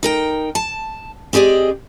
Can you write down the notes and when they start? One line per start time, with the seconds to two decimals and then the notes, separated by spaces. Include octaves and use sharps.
0.03 D#4 A#4 G5
0.55 A5
1.33 C4 G4 G#4 D5 D#5